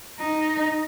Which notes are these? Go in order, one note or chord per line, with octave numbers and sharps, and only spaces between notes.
D#4